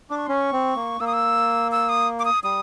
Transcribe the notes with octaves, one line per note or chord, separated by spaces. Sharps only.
D4 D6
C#6
C#4 C6
C#6
C4
A#3
A#3 E6
D#6
E6
E6
D#6
D6
D#6
G3 D#6